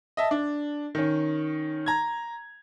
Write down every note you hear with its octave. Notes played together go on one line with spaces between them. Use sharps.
D#5 E5 A5
D4
D#3 C#4
A#5 G#6